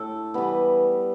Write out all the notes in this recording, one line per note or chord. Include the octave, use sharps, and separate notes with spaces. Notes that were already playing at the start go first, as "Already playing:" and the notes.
Already playing: A2 A4
E3 G3 B3